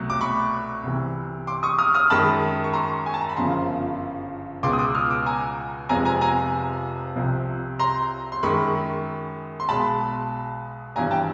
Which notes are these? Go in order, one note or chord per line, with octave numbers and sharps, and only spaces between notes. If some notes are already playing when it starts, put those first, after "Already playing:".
Already playing: C2 B2 F#3 A3
D6
B5 C#6
C2 C3 E3
C6 D6
C#6 D#6
D#6 F6
D#6 F6
F#2 D#3 G#3 A5 B5
C#6
A#5 C6
G#5
A5
A#5
B5
G1 F#2 C#3 F3 A#5 C6
C#2 B2 G#3 C6 D6
D#6
D6 E6
D#6 F6
D6 E6
G#5 A#5
F1 F2 C3 F3 G#3 G#5 A#5
G#5 A#5
G#5 A#5
C2 C3 F3
A#5 C6
C6
F#2 D#3 G#3 B5 C#6
C6
B1 B2 G#3 A5 B5
G#1 G2 E3 G3 G#5 A#5
G5 A5